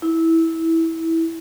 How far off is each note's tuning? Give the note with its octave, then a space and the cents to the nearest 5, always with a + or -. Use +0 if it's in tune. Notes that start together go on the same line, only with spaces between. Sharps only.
E4 -15